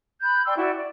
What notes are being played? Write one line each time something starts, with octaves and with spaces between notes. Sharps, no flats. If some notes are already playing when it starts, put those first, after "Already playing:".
B5 F#6 G6
D5 G5 C6 E6
E4 F#4 D5 E5
D5